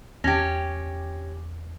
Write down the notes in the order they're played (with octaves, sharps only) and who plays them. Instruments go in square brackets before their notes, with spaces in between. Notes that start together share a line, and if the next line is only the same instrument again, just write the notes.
[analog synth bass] E2 [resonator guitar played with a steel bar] C#4 G4 [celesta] G#6 A#6